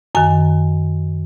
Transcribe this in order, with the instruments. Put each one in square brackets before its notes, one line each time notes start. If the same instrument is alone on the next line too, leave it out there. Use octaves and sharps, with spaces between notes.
[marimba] F#2 D#3 G#5